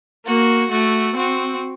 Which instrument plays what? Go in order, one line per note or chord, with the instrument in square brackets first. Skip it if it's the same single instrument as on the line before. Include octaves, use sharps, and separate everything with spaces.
[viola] A#3 [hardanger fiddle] F#4
[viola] A3 [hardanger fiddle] F#4
[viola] C4 [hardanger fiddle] F#4